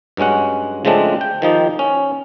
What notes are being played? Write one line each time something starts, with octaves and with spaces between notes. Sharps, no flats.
G2 F#3 G#3 C#4 F#5
C#3 F3 G#3 A3 C4 D4
G5
D#3 F3 D#4 G4
C#4